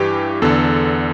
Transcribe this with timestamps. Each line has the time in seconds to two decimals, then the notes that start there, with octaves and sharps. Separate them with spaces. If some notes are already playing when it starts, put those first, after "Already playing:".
Already playing: G2 E3 G4
0.42 E2 D3 A4